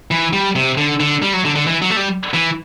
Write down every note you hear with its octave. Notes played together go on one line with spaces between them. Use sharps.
E3
G3
C3
D3
D3
G3
F#3
D3
D3
E3
F#3
A3
G3
E3